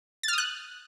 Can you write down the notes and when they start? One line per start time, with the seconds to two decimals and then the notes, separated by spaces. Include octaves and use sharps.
0.23 A6
0.28 F6
0.33 D#6
0.38 F#6